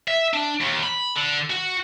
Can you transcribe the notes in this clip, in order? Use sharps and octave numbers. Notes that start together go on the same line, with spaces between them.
E5
D4
D#2
B5
D3
F#4